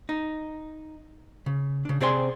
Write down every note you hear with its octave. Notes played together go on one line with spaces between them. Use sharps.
D#4
C#3
C#3 D4
C3 C4 G#4 D5 G#5 C6